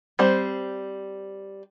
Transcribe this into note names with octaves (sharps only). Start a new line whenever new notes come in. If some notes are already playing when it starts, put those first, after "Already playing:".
G3 C4 C5